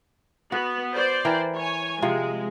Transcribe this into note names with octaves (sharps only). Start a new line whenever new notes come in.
B3 F#4
C5 D5
E3 A#4 G5
C#5 G#5
C3 F3 G#3